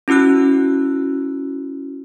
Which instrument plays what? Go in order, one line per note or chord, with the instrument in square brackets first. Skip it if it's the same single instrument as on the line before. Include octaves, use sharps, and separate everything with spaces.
[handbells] C#4 E4 F#4 E6 F#6